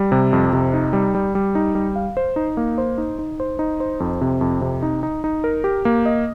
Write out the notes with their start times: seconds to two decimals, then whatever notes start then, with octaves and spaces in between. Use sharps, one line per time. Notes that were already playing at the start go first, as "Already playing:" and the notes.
Already playing: G3
0.12 C3
0.33 F2
0.53 C3
0.73 D#4
0.93 G3
1.15 G3
1.35 G3
1.55 D#4
1.75 G3
1.96 F5
2.17 C5
2.36 D#4
2.57 A#3
2.78 C5
2.98 D#4
3.19 D#4
3.40 C5
3.59 D#4
3.80 C5
4.00 F2
4.21 C3
4.41 F2
4.61 C3
4.83 D#4
5.03 D#4
5.24 D#4
5.44 A#4
5.64 G4
5.85 A#3
6.06 D#5